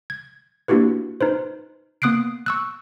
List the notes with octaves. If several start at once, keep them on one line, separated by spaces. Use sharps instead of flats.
G#6
A#3 D4 E4 F#4 G4 B4
D#4 B4 C5
A#3 B3 D#6 F#6 C7 D7
C#6 E6 F#6